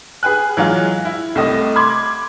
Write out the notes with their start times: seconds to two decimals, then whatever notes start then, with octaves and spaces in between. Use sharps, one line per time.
0.23 G#4 B4 G#5 F#6
0.57 E3 F#3 G#3 F4
1.05 E4
1.35 C2 A3 D#5
1.76 B5 C6 D6 G#6